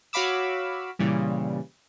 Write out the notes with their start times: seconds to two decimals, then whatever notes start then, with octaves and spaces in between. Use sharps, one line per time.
0.13 F#4 C#5 F5 B5 D6 E6
0.99 A#2 C#3 E3 G3